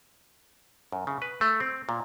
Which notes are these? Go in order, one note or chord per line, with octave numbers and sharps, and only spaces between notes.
F#2
C#3
B4
A3
C4
A#2